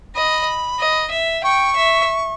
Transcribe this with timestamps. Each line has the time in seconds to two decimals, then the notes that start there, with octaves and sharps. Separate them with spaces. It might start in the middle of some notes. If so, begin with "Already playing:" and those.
0.15 D#5 B5
0.80 D#5
1.11 E5
1.44 G5 C#6
1.76 E5